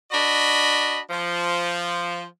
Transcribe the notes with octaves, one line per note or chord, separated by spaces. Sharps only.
D4 F#4 D#5 B5
F3